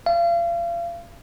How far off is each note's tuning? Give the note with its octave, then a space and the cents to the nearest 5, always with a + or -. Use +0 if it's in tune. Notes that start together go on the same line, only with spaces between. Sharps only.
F5 -35